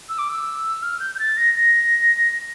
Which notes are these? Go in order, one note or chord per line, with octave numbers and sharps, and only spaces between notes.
E6
D6
E6
F6
G6
G6
A6
A#6
A#6